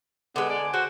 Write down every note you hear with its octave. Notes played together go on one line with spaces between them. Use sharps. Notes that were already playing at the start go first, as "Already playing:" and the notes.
D3 G#3 B3
D5
F#4 C5